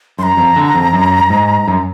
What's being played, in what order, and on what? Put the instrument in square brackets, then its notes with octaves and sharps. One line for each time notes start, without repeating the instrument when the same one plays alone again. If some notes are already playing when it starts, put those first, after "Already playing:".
[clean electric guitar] F#2 [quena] C6
[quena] A#5
[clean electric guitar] F2
D3
F2
F#2
G#2
F#2